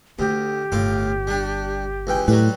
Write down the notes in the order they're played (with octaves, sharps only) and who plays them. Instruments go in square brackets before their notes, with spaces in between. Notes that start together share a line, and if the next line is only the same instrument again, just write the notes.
[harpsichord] D2 [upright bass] A3 [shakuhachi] G4
[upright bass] G1 [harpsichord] A2 F4 D6
[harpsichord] G3 D4
C#2 E3 G5
[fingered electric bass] A2 [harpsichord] F#3 G3 B4 [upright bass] E4